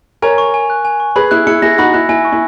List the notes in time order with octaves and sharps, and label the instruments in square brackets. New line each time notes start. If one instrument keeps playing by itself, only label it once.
[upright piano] A#4 C#5 [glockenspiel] G#5
[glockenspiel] C#6
G#5
F#6
G#5
C#6
[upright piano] G#4 B4 [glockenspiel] B5
[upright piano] E4 G#4 [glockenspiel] F#6
[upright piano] E4 G#4 [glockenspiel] C#7
[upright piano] E4 G#4 [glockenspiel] A#6
[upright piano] D#4 F#4 [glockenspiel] B5
[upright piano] E4 [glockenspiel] F#6
[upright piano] E4 [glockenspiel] G#5
[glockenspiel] C#6
[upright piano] E4